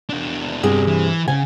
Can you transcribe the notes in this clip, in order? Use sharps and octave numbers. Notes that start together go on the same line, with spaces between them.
E2 D4
G2 C3 G#4
E3
C#3 G#5